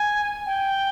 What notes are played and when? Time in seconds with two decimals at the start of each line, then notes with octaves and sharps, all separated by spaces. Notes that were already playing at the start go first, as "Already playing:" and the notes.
Already playing: G#5
0.46 G5